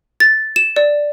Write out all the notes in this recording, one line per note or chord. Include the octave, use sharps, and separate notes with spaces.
A6
E7
D5